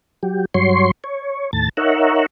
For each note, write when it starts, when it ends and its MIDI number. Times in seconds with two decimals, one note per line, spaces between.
0.23 0.45 54
0.23 0.45 67
0.54 0.91 43
0.54 0.91 54
0.54 0.91 73
0.54 0.91 84
1.04 1.51 73
1.53 1.69 39
1.53 1.69 45
1.53 1.69 81
1.53 1.69 93
1.77 2.26 63
1.77 2.26 70
1.77 2.26 73
1.77 2.26 76
1.77 2.26 78